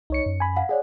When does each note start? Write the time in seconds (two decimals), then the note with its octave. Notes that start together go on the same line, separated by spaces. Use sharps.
0.10 C2 D#4 C#5 C#7
0.26 F#2
0.40 G#5 B5
0.56 F5 F#5
0.69 G#4 C#5 D5 F#5